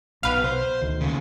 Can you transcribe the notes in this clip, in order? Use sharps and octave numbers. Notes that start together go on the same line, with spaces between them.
B1 B2 B4 F5
C5
D2 D#3
D#2 C#3